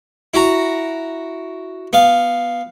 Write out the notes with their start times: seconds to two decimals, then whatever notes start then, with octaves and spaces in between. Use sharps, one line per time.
0.34 E4 F#4 A#5
1.93 B3 F5